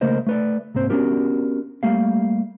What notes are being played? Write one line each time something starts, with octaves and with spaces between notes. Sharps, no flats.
C#3 A3 A#3 A#4 C5 D#5
A3 B4 D5
C2 G#2 A#3 C4 C5
B3 C#4 D4 F#4 G4 A#4
G3 A3 A#3 G4 F5